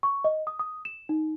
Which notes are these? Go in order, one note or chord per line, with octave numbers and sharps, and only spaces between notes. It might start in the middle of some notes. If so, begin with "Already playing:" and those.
C#6
D#5
D#6
D#6
E7
D#4